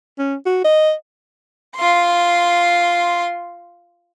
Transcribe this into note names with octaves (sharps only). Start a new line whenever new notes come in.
C#4
F#4
D#5
F4 C6